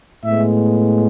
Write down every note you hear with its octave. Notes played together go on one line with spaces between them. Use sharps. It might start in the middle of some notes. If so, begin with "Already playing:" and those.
A2 G#3 B3 E5